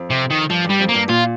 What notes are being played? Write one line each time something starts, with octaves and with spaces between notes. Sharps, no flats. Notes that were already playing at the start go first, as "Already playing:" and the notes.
Already playing: F2
C3
D#3
G2 F3
G2
G3
F2
A#3
G2
A#2 F4